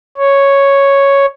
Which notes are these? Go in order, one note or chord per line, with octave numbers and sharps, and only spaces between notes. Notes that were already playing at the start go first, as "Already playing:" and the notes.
C#5